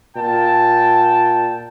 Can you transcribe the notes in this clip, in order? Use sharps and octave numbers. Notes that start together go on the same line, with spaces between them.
A#2 G5 A5